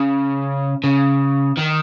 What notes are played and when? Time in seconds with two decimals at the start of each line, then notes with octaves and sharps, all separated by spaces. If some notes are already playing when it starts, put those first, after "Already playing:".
Already playing: C#3
0.84 C#3
1.58 D#3